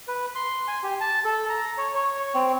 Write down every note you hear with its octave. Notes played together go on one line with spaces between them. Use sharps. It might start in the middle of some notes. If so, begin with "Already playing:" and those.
B4
C6
G#5
G4
A5
A4
A#5
C#5
C#5
C4